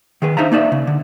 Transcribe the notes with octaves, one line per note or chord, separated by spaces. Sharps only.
D#3 G#4 B4
D4 D#4 C5 E5 F5 A#5
A#3 D#4 D5 E5
C#3
D3